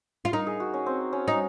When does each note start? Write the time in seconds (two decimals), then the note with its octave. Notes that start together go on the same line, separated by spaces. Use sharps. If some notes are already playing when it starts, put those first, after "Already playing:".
0.25 F4
0.33 D#4 A#4
0.47 G#4
0.60 F#4
0.74 C#4
0.86 C4
1.13 C#4
1.28 D#4